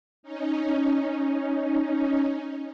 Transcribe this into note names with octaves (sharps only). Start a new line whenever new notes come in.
C#4 D#4